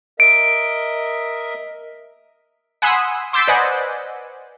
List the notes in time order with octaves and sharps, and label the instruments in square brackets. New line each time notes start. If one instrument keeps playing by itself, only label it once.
[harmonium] A#4 D#5 E5 [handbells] D7
[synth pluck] F#5 G#5 B5 C6 D#6 E6
C6 D6 E6 G6 A6 B6
B4 C5 D5 D#5 F#5 G#5